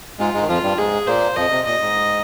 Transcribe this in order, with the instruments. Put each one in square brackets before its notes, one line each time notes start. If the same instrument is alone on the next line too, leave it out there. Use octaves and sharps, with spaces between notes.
[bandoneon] G#2 G#3 [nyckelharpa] F4
[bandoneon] G#2 G#3
D#3
[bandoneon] F2 F3 [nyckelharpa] F4
[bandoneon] G2 G3
[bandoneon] G#2 G#3 [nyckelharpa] G#4
[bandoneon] A#2 A#3 [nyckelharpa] C5
[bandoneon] F2 F3 [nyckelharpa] D#5
[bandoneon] C3
[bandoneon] A#2 [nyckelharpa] D#5
[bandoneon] G#2